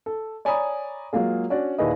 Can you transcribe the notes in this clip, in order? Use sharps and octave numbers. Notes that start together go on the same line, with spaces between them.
A4
C#5 D5 G#5 A#5 B5 D#6
F#3 G#3 A#3 F4 G#4
C#4 D4 F#4 D5
D#2 A#2 E4 G#4 B4 D#5